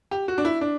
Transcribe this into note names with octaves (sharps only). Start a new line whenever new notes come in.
G4
F#4
D4
E4
D4